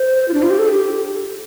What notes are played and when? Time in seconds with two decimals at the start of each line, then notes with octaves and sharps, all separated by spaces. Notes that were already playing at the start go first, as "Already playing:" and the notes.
Already playing: C5
0.28 F4
0.34 D4
0.42 F4
0.50 G4
0.59 A4
0.68 G4